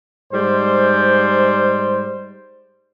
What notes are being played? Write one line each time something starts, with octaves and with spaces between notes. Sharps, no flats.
G#2 G3 C5